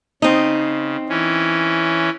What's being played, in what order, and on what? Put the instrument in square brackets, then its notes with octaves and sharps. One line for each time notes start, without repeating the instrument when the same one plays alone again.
[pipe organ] C#3 [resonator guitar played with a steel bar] C4 D#4
[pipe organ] E3 C#4